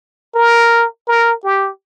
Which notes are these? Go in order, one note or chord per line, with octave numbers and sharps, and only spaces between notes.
A#4
A#4
G4